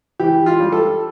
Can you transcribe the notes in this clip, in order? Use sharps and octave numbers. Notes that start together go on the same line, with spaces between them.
E3 G4
F4
G3
A4